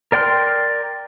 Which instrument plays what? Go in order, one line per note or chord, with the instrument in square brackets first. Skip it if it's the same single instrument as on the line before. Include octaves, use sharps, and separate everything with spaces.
[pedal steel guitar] A#4 D5 G5 C6 F6